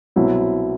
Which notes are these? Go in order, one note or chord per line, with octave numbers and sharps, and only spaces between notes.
C2 B2 F#3 C4 E4